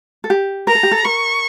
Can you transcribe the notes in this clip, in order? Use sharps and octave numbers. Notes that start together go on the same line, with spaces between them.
A4
G4
A#4 A#5
A4
G4
A4
A#4 C#6